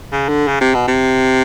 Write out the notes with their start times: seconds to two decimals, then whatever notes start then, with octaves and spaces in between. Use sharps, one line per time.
0.12 C#3
0.29 D3
0.48 C#3
0.60 C3
0.74 B2
0.87 C3